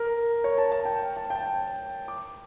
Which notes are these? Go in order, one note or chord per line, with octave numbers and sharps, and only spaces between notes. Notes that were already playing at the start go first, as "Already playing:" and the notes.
Already playing: A#4
C#5
A5
A5
G5
A5
G5
A5
D6